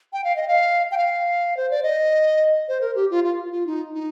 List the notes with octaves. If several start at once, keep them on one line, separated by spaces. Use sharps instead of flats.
G5
F5
D#5
F5
G5
F5
C5
D5
D#5
C5
A#4
G4
F4
F4
F4
D#4
D#4